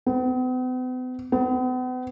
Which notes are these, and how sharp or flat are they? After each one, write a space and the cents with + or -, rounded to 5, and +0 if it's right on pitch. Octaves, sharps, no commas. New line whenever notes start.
B3 +45
B3 +40